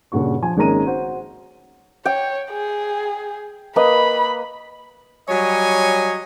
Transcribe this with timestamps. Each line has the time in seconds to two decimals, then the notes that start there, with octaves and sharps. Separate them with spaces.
0.12 G2 A#2 C#3 F#4 C#6
0.42 F3 G#5
0.57 G#1 G#3 A#3 C#4 A#5 D#7
0.86 F#4 C5
2.05 C#5 G5
2.51 G#4
3.76 A#3 B4 D#5 B5
5.29 F#3 G3 C#5 D#5 G#5